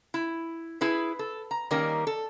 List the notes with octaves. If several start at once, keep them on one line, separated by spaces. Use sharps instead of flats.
E4
E4 G#4 B4
A4
A#5
D#3 G3 A#3 C#4 A#4
A4